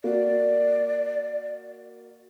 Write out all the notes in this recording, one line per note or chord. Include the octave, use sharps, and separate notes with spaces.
A#3 F#4 D5